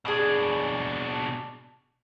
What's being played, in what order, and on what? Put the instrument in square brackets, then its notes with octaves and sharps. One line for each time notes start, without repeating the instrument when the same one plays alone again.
[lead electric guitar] B2 D4 [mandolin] G#4 D5 D#6